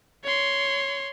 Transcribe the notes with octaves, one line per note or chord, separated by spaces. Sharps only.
C#5 C6